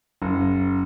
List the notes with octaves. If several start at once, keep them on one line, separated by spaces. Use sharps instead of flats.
F#1